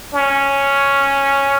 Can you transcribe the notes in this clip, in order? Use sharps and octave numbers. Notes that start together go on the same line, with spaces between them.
C#4